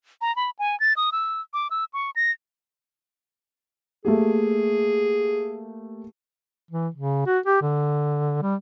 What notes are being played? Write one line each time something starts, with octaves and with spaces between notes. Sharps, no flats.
A#5
B5
G#5
A6
D#6
E6
D6
E6
C#6
A#6
A3 A#3 G4 G#4
E3
C#3
F#4
G4
D3
G3